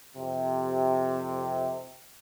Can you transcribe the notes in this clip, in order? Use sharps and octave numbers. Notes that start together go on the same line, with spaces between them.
F2 C3